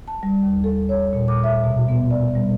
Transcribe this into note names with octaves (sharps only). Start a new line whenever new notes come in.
A5
G3
D#2
A4
C#5
A#2
D6
E5
B2
B3
D5
G3